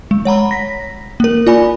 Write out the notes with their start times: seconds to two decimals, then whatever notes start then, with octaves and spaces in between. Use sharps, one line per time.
0.11 G#3
0.25 C#5 F#5 A#5 B5
0.51 A#6 B6
1.20 A#3 A#4
1.47 F4 D5 G#5 B5